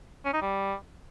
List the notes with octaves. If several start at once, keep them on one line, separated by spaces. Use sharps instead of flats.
C#4
D#4
G3